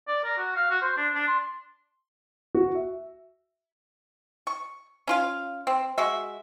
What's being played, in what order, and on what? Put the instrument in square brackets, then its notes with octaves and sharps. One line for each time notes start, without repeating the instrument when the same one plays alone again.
[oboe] D5
A#4
F#4
F5
F#4
C5
D4
D4
C6
[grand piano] F#4
E5
[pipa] C#6
C#4 F4 F5
C4
G#3 F#4 E5